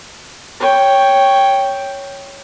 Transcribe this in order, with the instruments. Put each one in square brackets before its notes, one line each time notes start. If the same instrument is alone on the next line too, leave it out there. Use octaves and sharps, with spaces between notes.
[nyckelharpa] C#5 G5